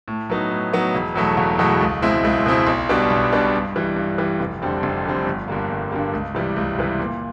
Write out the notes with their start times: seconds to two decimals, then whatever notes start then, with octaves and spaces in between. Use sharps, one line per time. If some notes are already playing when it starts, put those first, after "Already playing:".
0.08 A2
0.30 F#3 B3 D#4
0.51 A2
0.73 F#3 B3 D#4
0.95 E1
1.15 E2 B2 F#3 A3
1.37 E1
1.59 E2 B2 F#3 A3
1.81 C#2
2.02 B2 G#3 C4 E4
2.24 C#2
2.46 B2 G#3 C4 E4
2.67 B1
2.89 B2 G3 B3 D4
3.10 B1
3.32 B2 G3 B3 D4
3.54 G2
3.76 E3 G3
3.96 G2
4.18 E3 G3
4.40 F1
4.62 F2 D3 G3 C4
4.83 F1
5.05 F2 D3 G3 C4
5.26 G1
5.48 G2 D3 G3 A#3
5.70 G1
5.91 G2 D3 G3 A#3
6.13 C#2
6.35 C3 E3 G3
6.56 C#2
6.78 C3 E3 G3
6.99 A#2